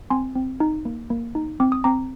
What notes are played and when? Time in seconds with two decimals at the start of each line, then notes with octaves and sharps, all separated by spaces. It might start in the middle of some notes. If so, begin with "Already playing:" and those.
0.10 C4 G#5 C6
0.35 C4
0.60 D#4
0.85 A#3
1.10 A#3
1.35 D#4
1.60 C4 D6
1.72 D#6
1.84 C4 A#5 D6